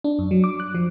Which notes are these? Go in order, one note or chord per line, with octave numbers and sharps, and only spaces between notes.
D4
F#2
F#3
D6
F#6
F3